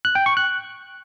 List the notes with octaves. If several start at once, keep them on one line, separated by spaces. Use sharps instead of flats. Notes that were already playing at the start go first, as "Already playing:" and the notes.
F#6
G5
C#6
F#6